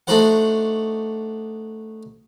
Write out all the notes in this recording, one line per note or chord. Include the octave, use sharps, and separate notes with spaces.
A3 D4 D#4 F#4 C5 F#5